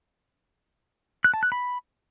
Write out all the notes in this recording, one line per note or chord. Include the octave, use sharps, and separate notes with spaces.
F#6
A5
F#6
B5